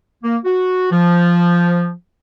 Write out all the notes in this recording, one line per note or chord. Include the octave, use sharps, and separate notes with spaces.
A#3
F#4
F3